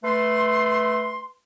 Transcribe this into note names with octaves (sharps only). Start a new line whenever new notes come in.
A3 B4 C6